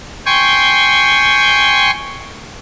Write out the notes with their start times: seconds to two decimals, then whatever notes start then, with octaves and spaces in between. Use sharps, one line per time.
0.26 G5 G#5 C6 C#6